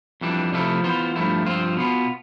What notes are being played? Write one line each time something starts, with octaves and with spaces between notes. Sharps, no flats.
F2 E3 G3 D4
C3 F3 A3 E4 A4
E3 B3 F4 C5
G2 F3 A3 E4
G2 F3 C4 F4
B2 B3 F4